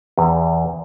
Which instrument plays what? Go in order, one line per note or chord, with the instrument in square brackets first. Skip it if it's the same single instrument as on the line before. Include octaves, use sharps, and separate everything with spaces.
[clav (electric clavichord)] E2